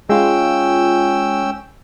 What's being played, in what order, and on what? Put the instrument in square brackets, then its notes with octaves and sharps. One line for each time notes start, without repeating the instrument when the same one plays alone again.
[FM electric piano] G#3 F4 [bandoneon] C#4 G5 E6